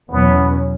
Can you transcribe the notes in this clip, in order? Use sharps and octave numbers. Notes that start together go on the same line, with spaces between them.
E2 B2 F#3 B3 C#4